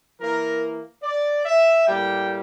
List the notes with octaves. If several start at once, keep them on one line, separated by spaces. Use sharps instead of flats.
E3 A#3 A#4
D5
E5
A2 G3 A#3 G5